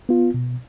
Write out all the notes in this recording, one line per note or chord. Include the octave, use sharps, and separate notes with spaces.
B3 F4
B2